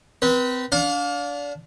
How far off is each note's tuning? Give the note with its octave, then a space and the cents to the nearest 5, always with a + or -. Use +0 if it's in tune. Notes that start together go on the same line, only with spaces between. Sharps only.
C4 -30 B4 -20
D4 -25 F5 +30